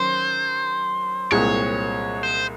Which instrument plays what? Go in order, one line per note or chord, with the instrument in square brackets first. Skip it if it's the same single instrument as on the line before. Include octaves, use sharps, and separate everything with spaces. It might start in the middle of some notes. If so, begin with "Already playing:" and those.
Already playing: [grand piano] D#3 F#3 C#4 [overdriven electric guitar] C5
[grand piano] C2 A#2 G#3 C4 [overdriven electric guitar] C#5
[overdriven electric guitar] C5